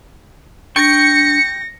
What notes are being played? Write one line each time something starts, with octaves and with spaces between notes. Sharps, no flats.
D4 G5 C#6 A#6 C#7